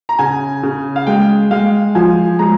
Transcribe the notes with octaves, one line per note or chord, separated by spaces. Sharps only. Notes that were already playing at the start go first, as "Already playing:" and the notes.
A#5
C#3 G#5
C#3
F5
G#3 G5
G#3 F5
F3 G#5
G#3 A#5